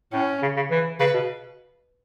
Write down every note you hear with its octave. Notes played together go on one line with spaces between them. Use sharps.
A2 C#4
C#3
C#3
E3
C#3 B4
B2